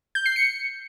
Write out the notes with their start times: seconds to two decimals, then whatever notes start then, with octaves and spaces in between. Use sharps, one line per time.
0.15 G6
0.26 C7
0.36 C#7